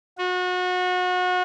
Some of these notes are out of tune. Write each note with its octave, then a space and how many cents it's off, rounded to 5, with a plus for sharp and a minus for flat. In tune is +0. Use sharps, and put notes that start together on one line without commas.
F#4 -30